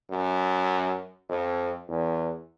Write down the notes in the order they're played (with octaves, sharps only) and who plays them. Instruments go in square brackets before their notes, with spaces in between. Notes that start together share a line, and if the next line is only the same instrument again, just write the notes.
[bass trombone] F#2
F2
E2